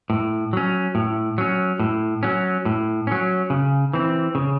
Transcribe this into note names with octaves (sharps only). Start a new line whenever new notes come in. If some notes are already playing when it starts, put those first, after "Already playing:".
A2
F#3 C#4
A2
F#3 C#4
A2
F#3 C#4
A2
F#3 C#4
C#3
E3 C4
C#3